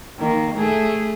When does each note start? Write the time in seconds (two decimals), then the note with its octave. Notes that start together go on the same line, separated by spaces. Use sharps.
0.19 D#3 A#3
0.55 A3 G#4